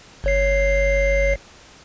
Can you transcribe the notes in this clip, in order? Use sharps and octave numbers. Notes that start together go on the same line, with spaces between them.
G1 C#5 C7